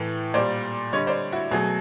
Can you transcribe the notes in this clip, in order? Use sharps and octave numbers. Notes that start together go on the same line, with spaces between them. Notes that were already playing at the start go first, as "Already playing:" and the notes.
Already playing: A2 E3 A3
A#2 G3 C5 D5
D3 G3 C#5 D#5
C5 D5
E4 F#4
B2 F#3 A3 F#4 G#4